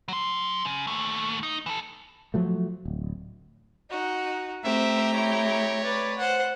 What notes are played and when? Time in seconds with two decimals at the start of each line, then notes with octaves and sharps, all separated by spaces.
0.08 F#3 C6
0.65 C#3
0.87 D#2 A3
1.43 D#4
1.66 E3 A4
2.34 F3 F#3 A3
2.85 D1
3.90 D#4 F#4
4.65 A3 C4 G4 E5 A#5
5.14 E4 C#5
5.82 B4 D5
6.18 C5 F#5